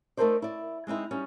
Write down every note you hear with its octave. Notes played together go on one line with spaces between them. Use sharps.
A3 D#4 A4 A#4 C5 D5
E4 D5
G#3 C4 D#4 E4
G3 C#4 D#4